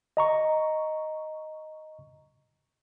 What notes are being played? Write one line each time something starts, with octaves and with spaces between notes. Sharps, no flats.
D#5 A#5 C#6